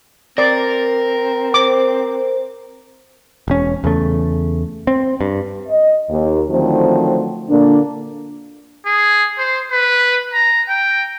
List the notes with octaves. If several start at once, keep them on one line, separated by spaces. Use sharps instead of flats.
C4 A#4 D5
C5 D6
E1 C#4
E2 C#3 A3
C4
G2
D#5
D#2
D3 D#3 F3 F#3 A3 C4
A#2 D3 A#3 D4
G#4
C5
B4
A#5
G5